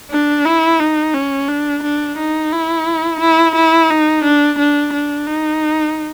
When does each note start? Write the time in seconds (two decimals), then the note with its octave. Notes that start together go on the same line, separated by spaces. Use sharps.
0.11 D4
0.45 E4
0.80 D#4
1.14 C#4
1.48 D4
1.84 D4
2.18 D#4
2.52 E4
3.21 E4
3.56 E4
3.90 D#4
4.25 D4
4.59 D4
4.94 D4
5.27 D#4